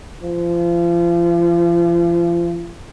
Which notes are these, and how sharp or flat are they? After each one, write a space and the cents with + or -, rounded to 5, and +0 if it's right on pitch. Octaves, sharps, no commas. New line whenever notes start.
F3 -35